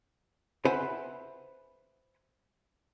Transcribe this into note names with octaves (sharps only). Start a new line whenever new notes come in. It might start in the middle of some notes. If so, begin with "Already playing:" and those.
B4 C5 E5 F#5 G#5 B5